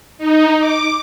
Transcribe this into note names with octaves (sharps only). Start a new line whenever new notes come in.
D#4
D6